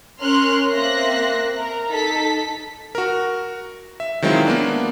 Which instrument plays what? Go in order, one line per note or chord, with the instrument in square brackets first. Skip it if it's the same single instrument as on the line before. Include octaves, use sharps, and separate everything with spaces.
[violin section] C#4 A#4 C6 F6 F#6
A#3 C4 E5 F#6 A#6 C7
A#4 A#5
D#4 A4 B6
[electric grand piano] F#4 A#4
E5
D#3 F#3 G#3 C4 E4 F4
A#3 B3 D4